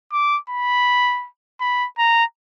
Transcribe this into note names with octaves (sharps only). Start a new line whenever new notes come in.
D6
B5
B5
A#5